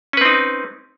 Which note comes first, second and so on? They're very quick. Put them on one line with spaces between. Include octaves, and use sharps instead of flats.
C#4 B4 C4 D#4